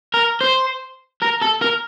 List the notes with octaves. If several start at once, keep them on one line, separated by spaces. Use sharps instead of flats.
A#4
C5
A#4
A4
A#4